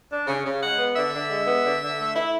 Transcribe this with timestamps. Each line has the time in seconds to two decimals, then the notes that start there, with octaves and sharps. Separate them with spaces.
0.10 D4
0.27 C#3
0.45 C#3
0.61 G#3 F#5
0.79 B3
0.96 D3 E5
1.12 D3
1.29 G#3
1.47 B3
1.64 D3
1.80 D3
1.98 A3
2.15 E4